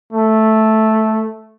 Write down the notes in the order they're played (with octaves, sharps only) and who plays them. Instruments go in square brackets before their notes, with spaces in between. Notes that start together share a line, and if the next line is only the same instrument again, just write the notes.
[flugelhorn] A3